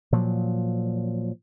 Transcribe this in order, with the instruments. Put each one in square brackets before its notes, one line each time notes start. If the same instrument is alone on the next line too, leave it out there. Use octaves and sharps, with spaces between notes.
[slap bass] A#2 F3 F#3